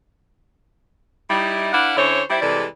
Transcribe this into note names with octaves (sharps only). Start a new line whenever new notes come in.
G3 D#4 E4
D4 E4 B4 D5 F5 F#5
D3 C#4 E4 C5 C#5
G3 C4 E4
C3 E3 G3 G#3 A4 D5